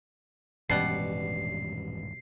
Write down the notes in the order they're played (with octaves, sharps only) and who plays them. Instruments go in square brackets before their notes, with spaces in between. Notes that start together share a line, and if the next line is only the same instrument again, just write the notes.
[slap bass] D#1 G2 G#3 [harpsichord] A1 [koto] B2 G3 F#5 [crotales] C7